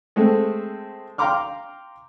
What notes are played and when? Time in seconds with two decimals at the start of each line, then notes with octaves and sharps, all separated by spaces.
0.16 G#3 A3 C4 A4
1.18 F5 G5 A#5 C6 D6 F6